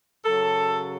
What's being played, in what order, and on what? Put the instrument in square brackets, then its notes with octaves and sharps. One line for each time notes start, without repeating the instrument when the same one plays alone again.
[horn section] F#2 C#3 F#3 A4